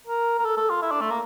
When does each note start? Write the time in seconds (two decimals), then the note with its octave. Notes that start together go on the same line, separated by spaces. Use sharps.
0.07 A#4
0.39 A#4
0.45 A4
0.57 A4
0.70 F4
0.82 E4
0.91 D4
1.01 A3
1.11 A#3